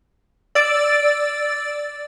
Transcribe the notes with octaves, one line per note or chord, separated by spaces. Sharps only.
D5 E6 A6 D7